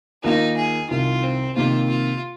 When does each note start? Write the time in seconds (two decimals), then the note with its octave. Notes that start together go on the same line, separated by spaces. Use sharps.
0.23 D#2 D#3 A#3 D#4 F4
0.57 G#4
0.89 C2 C3 D#3 F4
1.23 C4
1.56 C3 D#3 A#3 F4
1.89 F4